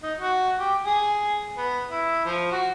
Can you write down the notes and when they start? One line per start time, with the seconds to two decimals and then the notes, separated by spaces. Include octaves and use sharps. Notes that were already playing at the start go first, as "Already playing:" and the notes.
0.03 D#4
0.18 F#4
0.59 G4
0.83 G#4
1.57 B3
1.91 E4
2.25 F3
2.52 F#4